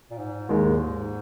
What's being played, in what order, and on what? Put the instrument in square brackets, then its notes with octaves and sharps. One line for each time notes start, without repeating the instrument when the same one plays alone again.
[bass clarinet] A#2
G#2
[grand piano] D#2 D#3 G#3 D#4 [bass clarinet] G#2
[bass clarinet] A#2
G#2